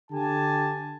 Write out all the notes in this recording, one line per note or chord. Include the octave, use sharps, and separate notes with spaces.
D3 G4 G#5 A5